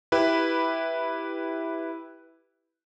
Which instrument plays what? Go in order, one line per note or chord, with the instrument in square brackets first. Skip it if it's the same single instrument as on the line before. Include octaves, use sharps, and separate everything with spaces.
[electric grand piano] E4 G4 B4